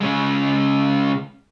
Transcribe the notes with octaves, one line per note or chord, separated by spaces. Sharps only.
C#3 G#3